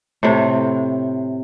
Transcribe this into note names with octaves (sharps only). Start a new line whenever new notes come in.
A2 C3